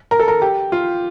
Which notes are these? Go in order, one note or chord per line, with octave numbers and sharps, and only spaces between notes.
A#4
A4
A#4
G4
F4